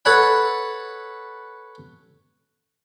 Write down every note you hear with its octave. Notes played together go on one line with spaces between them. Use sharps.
A4 B4 C#5 F#5 B5